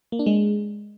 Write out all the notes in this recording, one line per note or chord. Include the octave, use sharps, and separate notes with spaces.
A#3
D4
G#3